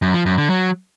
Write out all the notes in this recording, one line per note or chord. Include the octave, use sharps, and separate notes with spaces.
F#2
F3
F#2
D3
F#3